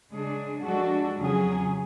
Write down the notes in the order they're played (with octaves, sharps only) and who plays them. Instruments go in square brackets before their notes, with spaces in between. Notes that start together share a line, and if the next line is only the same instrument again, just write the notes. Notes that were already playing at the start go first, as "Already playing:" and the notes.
[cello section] C#3 G#3 D4 G#4
F3 G#3 D4 F#4 A4
F2 C#3 F#3 C#4 G#4